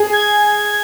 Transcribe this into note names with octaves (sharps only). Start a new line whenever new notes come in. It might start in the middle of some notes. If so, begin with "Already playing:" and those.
Already playing: G#4
G#6